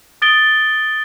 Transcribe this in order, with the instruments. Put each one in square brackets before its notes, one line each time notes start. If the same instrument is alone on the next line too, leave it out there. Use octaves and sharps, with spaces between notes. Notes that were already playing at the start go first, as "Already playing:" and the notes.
[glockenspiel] D#6 A6 D7 G7